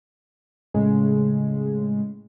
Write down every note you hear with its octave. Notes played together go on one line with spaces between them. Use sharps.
A2 C#3 G#3